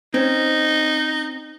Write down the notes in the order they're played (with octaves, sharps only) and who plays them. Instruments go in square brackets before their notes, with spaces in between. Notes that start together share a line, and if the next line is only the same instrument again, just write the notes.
[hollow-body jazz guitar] C4 C#4 [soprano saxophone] D#4